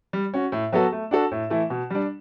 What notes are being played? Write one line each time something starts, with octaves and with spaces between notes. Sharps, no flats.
G3
C#4 F#4
A2
F#3 B3 F#4 A4
A3
D4 F#4 A4
A2
E3 A3 E4
B2
G3 D4